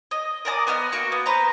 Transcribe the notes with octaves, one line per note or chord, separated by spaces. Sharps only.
D#5
A#4 D5 A5 D#6
B3 D#5 G5 F6
A#3 F#4 C#6
B3
B4 C5 A#5